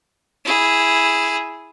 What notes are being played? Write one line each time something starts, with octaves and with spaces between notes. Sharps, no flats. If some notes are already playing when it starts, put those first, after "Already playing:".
E4 G#4